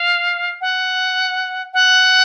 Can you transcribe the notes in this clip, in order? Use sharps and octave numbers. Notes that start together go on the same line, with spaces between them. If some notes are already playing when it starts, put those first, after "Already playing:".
Already playing: F5
F#5
F#5